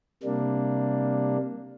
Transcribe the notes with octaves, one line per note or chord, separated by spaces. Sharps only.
C3 G3 A#3 D4